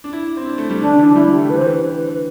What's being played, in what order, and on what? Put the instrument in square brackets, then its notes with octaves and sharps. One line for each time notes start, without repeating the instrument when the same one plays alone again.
[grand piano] D4
E4
C4
D4
A3
G3
[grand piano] D3 [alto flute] D4
[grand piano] D3
E3
[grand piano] G3 [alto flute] E4
[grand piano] G3
[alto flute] G4
[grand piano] A3
[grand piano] E3 [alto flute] B4
[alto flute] C5
[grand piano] E3
[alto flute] B4
[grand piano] D3